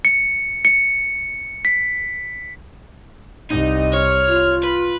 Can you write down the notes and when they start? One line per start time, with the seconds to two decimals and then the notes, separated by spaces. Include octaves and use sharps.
0.05 C#7
0.65 C#7
1.65 B6
3.51 C2 D#4 D#5
3.94 C#5 F6
4.28 F4
4.63 B4